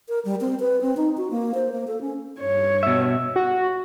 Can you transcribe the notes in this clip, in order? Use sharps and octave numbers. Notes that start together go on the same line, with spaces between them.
A#4
G3
C4
B4
C4
D#4
F#4
A#3
C5
A#3
A4
C#4
G2 C#5
B2 E5
F#4